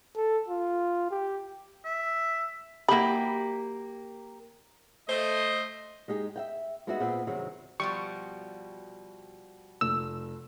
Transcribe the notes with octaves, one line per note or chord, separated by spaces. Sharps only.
A4
F4
G4
E5
F#3 A#3 E4 G4 B5
A3 C5 D#5
G#3 D#4 G4 G#4
E5 F5 G5
G#3 B3 D#4 F#4 G#4 E5
A#2 B3 C4 G#4 C5 F#5
G2 C3 D#3 F#3 G#4
B2 F3 G3 C#6
F1 E6